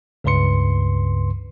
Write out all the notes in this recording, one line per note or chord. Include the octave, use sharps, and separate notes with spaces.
C#2 G2 C#3 B4 C6 C#7